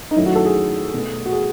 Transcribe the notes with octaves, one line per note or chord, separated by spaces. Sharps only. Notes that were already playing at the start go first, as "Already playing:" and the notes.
D#4
F#2 D#3 F#3 A3 E4
F#4
A4
G#4
B2 A3
F#4
G#4